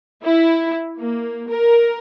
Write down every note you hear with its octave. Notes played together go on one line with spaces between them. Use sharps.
E4
A#3
A#4